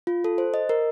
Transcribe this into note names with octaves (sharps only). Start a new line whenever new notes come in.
F4
A4
C5
D#5
A#4